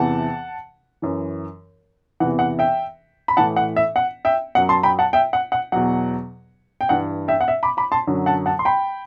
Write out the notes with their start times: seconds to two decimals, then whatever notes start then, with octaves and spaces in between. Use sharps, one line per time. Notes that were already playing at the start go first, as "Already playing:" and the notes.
Already playing: E2 C3 E3 F#5 A5
1.02 F#2 E3
2.20 E2 C3 E3 F#5
2.39 F#5
2.59 E5 G5
3.28 B5
3.37 A2 E3 F#5 A5
3.56 F#5
3.76 E5
3.96 F#5
4.25 E5 G5
4.55 F#2 F#3 F#5
4.69 A5 C6
4.83 G5 B5
4.99 F#5 A5
5.13 E5 G5
5.33 F#5
5.52 F#5
5.72 E2 B2 F#3 F#5
6.81 G5
6.89 G2 E3 F#5
7.28 E5 G5
7.41 F#5
7.48 E5
7.63 B5 D6
7.77 B5 D6
7.92 A5 C6
8.07 F#2 D3 F#3
8.26 F#5 A5
8.46 F#5 A5
8.59 C6
8.65 G5 B5